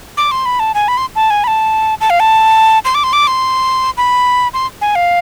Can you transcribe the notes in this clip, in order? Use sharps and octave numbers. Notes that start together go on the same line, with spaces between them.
D6
C6
B5
A5
G#5
B5
C6
A5
G#5
B5
A5
A5
F5
A5
C6
D6
C6
D6
C6
B5
C6
G#5
F5